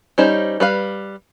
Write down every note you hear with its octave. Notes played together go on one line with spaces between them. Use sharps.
G3 C#4 D#4 C5 C#5
G3 B4 F5